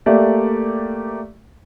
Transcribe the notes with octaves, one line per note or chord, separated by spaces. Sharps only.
A3 A#3 G4 D5 E5